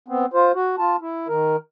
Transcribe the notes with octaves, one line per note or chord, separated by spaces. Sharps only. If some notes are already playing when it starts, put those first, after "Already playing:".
B3 C4
F4 C5
F#4
F4 A5
E4
D#3 A#4